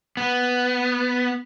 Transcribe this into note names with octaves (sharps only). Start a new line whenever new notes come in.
B3